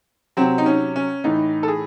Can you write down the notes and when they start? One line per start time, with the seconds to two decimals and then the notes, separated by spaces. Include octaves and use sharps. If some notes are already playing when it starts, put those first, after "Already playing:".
0.37 C3 F#3 C4
0.58 D#4
0.66 C#4
0.96 C#4
1.24 A2 E3 D#4
1.63 A4
1.68 G#4